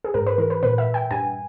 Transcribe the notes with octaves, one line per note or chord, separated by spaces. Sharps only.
G#4
G#2 A#4
B4
E3 A#4
B4
A#2 B4
E5
G5
G2 G#5